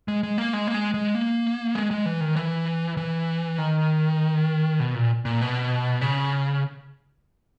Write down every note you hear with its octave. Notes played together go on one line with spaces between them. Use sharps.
G#3
G#3
A#3
G#3
A#3
G#3
G#3
A#3
G#3
G#3
E3
D#3
E3
E3
D#3
B2
A#2
A#2
B2
C#3